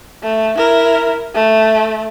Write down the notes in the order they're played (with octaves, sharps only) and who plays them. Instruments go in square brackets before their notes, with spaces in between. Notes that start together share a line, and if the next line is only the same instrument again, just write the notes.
[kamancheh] A3
E4 A#4
A3